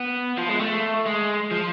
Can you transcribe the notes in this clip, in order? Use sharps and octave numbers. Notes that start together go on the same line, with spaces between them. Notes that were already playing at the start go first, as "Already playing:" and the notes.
Already playing: B3
F3
G#3
A3
G#3
F3